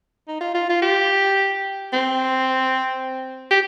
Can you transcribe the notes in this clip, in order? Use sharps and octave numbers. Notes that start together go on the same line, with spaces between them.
D#4
F4
F4
F4
G4
C4
G4